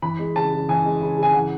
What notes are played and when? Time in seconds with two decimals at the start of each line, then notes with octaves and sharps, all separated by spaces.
0.02 E3 B5
0.19 G#3
0.35 C#3 A5
0.53 C#3
0.69 E3 G#5
0.85 G#3
1.01 C#3
1.18 C#3
1.23 G#5
1.34 E3 F#5